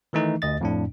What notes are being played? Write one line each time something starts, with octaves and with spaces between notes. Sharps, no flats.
D#3 E3 A3 D#4
D2 D#5 A6
F2 A2 D4